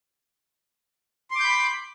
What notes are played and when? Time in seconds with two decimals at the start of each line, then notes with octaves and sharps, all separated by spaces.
1.31 C6
1.35 D6
1.40 G6
1.44 B5